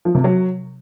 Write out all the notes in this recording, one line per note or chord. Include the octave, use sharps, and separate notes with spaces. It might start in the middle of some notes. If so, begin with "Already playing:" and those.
F3
C3
F#3